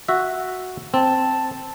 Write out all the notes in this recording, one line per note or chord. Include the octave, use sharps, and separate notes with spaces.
F#4 E5
C4 A5